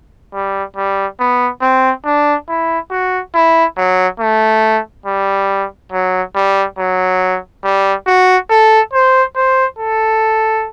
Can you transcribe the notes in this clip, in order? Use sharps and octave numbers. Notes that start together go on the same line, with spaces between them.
G3
G3
B3
C4
D4
E4
F#4
E4
F#3
A3
G3
F#3
G3
F#3
G3
F#4
A4
C5
C5
A4